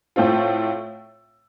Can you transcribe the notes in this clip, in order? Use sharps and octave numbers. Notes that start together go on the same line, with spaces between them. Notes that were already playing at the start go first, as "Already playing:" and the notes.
A2 A3 C4 F4